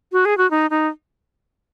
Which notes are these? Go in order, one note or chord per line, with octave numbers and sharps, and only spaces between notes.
F#4
G#4
F#4
D#4
D#4